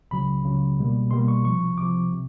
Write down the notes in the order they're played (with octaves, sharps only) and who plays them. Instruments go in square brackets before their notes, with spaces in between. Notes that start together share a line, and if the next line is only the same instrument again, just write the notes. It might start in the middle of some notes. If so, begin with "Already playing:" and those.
[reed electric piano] C#2 C#3 F#3 B5
C#2 C#3 F#3
C2 B2 G3 A#3
C2 B2 G3 A#3 C6
C#6
C2 C3 F3 C#6
C2 C3 F3 D6
C3